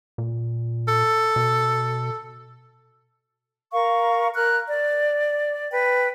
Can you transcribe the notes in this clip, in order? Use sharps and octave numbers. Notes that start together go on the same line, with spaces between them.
A#2
A4
B2
A#4 F5 C#6
A#4 F6 F#6
D5
B4 G5